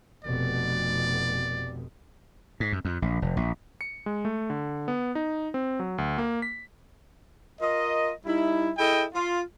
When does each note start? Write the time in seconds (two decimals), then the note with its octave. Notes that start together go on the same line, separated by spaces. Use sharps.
0.24 F1 B2 D5
2.60 G#2
2.73 F#2
2.85 F2
3.02 A#1
3.22 F1
3.37 A#1
3.81 C#7
4.06 G#3
4.25 A3
4.50 D3
4.88 B3
5.15 D#4
5.54 C4
5.79 F#3
5.98 D2
6.18 A#3
6.42 B6
7.60 F4 A#4 D#5
8.26 G3 D#4 E4
8.78 E4 G#4 A4 D#5 G5
9.14 F4